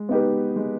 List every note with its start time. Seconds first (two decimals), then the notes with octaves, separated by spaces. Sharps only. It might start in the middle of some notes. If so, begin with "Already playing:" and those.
Already playing: G#3
0.09 B3 D#4 G4 B4
0.56 G#3